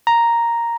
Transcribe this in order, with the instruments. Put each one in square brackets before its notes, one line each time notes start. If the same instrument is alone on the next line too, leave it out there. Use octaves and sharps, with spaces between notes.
[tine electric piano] A#5